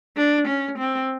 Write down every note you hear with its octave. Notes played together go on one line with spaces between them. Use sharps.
D4
C#4
C4